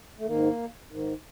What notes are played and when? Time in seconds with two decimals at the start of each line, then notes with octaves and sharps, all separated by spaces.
0.18 A3
0.26 G#2 D#3 A#3
0.91 G#2 D#3